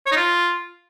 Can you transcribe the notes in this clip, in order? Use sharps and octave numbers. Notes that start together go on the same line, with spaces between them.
C#5
D#4
F4